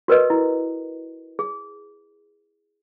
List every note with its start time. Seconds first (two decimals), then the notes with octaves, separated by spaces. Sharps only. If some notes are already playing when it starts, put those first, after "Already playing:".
0.08 F#4 A#4 B4 D#5
0.30 E4
1.39 G#4